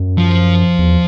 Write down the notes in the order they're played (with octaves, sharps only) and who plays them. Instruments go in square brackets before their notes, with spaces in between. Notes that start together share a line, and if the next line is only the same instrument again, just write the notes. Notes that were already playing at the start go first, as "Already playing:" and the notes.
Already playing: [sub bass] F#2
[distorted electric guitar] F3
[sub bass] E2